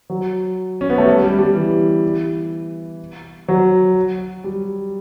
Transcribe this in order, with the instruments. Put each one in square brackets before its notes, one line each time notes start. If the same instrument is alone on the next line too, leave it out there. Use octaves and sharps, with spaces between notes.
[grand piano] F#3
C#4
B3
A3
G3
G3
G3
E3
F#3
G3